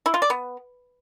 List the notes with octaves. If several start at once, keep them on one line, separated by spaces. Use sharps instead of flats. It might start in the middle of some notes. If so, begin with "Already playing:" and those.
E4
F4
D5
B3